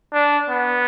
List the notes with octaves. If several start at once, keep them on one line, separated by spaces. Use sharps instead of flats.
D4
B3